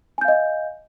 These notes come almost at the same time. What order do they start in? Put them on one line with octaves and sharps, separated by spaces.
G#5 G6 F5 D#5